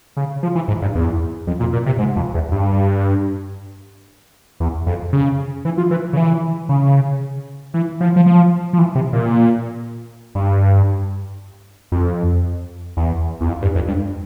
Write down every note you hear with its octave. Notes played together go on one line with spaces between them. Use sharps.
C#3
F3
E3
G#2
G2
E2
F2
A#2
A#2
C3
G#2
F2
E2
G2
E2
F2
C#3
E3
F3
E3
C#3
E3
C#3
E3
F3
F3
F3
F3
E3
C3
A#2
G2
F2
E2
E2
F2
G2
F2
G2